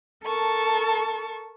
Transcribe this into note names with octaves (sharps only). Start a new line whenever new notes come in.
A4 A#4 A5 C#6